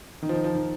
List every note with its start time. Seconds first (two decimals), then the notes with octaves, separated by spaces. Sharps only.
0.22 D#3
0.29 F3
0.33 D#3
0.44 F3
0.55 D#3